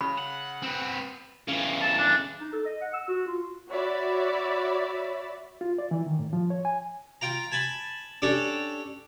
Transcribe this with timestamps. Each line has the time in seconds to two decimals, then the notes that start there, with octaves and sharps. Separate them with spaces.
0.01 C#3 B5
0.18 F#5
0.62 C4 B4
1.48 C#3 E3
1.81 A5
1.98 D4
2.40 D#4
2.53 A4
2.66 D#5
2.81 F#5
2.94 E6
3.08 F#4
3.27 F4
3.70 F#4 C#5 D5 E5 B5
5.61 F4
5.78 D5
5.91 E3
6.06 D#3
6.19 A2
6.33 F3
6.50 C#5
6.65 G#5
7.21 F4 G5 A#5
7.52 G#5 A5 B5
8.22 C#4 D4 G4 A4